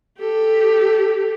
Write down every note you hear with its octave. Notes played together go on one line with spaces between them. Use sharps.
G4 A4